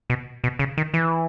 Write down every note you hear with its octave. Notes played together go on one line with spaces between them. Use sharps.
B2
B2
C#3
D#3
E3